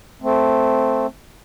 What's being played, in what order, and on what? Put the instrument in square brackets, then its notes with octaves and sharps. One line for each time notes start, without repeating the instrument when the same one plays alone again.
[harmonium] A3 C4